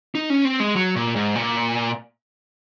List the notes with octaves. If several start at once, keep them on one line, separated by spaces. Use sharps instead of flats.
D#4
C#4
C4
G#3
F#3
A#2
G#2
A#2